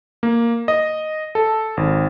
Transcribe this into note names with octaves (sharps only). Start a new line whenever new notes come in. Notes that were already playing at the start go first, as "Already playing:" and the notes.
A#3
D#5
A4
G#1